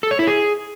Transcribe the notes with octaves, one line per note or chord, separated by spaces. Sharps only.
A4
C#5
E4
G#4